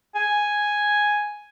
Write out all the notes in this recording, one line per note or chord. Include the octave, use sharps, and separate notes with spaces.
G#5